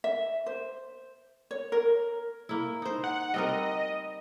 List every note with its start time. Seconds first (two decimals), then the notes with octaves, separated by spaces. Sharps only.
0.04 E5
0.46 C5
1.51 C#5
1.72 A#4
2.49 A#3 E4
2.82 D#4 C5
3.04 F#5
3.34 G3 C4 A#4 D#5